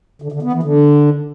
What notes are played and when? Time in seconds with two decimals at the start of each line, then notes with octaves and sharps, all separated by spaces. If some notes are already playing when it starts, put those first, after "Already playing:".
0.22 D3
0.32 D3
0.42 B3
0.53 E3
0.63 D3